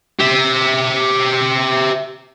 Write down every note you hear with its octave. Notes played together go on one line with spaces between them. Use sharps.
G4 E5